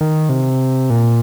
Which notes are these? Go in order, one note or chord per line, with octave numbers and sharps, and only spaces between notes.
D#3
C3
A#2